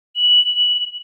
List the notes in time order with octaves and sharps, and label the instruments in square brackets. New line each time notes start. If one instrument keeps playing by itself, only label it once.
[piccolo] F#7